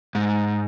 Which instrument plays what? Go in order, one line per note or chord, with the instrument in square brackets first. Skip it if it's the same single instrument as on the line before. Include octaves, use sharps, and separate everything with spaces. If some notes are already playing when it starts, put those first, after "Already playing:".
[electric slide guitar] G#2